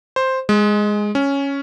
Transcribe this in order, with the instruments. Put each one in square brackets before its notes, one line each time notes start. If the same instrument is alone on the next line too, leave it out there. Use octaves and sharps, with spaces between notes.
[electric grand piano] C5
G#3
C#4